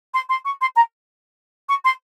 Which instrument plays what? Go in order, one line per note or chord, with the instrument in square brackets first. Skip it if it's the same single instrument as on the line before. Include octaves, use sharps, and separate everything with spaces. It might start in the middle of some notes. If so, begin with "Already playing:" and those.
[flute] C6
C6
C#6
C6
A#5
C#6
C6